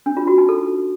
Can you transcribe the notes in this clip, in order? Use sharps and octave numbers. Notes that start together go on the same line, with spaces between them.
D4
F4
F#4
D#4
A4